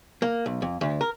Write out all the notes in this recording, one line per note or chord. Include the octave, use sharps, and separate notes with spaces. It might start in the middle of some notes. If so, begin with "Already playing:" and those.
A#3
B1
F2
D2
A#4